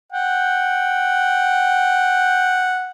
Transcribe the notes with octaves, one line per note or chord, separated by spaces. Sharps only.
F#5 G5